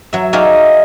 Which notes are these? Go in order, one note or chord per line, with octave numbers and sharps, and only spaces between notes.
F#3 E5
D#4 F#4 G#4 D5 E5 F5